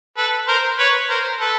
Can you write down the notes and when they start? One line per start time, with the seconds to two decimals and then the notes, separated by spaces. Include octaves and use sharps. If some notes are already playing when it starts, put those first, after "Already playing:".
0.18 A4 B4
0.48 A#4 C5
0.79 B4 C#5
1.10 A#4 C5
1.41 A4 B4